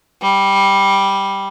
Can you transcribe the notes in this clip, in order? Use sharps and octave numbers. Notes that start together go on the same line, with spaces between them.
G3